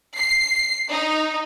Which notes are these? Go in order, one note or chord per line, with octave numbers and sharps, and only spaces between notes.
C7
D#4